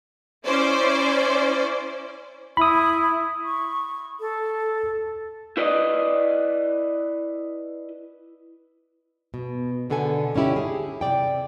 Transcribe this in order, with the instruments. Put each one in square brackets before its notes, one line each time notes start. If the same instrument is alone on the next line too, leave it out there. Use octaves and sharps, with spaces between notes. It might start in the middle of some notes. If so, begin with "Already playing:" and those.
[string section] C#4 E4 C5 D5
[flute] E4 [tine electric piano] B5 D#6
[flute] C#6
A4
[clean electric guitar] E4 B4 D5 D#5
[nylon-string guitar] B2
B2 D3 B3 A4 G#5
D3 C#4 D#4 E4 G4
G#4
C3 D5 G5